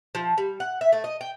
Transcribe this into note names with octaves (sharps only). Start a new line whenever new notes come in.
F3
G3
F#5
E5
A3
D#5
G5